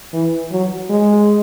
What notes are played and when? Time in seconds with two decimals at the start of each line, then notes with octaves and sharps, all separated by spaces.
0.13 E3
0.51 F#3
0.90 G#3